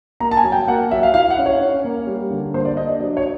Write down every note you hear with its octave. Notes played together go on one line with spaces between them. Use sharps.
A#3 A#5
A5
G#5
F#3
G5
A#3 F#5
F#3 E5
F5
E4 F5
F#5
C#4
C#5
C#4
A#3
G3
D3
A#3 C5
D5
D4 D#5
D5
F#3 D5
C#5